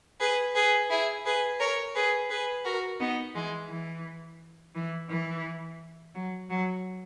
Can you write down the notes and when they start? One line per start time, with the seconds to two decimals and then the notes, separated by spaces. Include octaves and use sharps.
0.20 G#4 B4
0.55 G#4 B4
0.90 E4 G#4
1.25 G#4 B4
1.60 A#4 C#5
1.95 G#4 B4
2.30 G#4 B4
2.65 F#4 A#4
3.00 B3 D#4
3.35 E3 G#3
3.70 E3
4.75 E3
5.10 E3
6.15 F#3
6.50 F#3